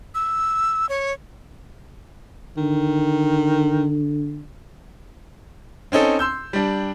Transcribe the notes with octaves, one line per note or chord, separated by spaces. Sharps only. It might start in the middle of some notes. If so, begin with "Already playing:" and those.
E6
C#5
D3 D#3
C4 C#4 D#4 A4
C6 E6 G6
G3 D4